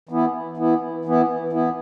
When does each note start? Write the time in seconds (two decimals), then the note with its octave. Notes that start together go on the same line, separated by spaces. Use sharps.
0.09 E3 B3 E4
0.57 E3 B3 E4
1.05 E3 B3 E4
1.53 E3 B3 E4